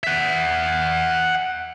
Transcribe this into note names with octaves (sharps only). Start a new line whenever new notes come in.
E5 F#5